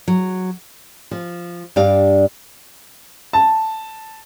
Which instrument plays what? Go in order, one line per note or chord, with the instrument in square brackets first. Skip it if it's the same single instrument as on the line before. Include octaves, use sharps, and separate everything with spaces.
[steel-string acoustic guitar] F#3
[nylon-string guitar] F3
G2 G3 D4 D5 F5
[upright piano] A5